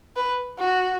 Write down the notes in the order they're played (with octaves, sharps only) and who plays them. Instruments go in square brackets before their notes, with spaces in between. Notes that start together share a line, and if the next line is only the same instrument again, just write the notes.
[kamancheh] B4
F#4